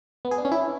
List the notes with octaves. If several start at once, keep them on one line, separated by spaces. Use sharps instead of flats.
B3
G#4
D4
C#4
E4